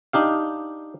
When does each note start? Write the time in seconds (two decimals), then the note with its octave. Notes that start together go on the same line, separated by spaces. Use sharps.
0.13 D4 D#4 G4 F5